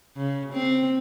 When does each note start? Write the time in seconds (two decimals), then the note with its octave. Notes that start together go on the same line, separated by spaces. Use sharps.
0.17 C#3
0.53 C4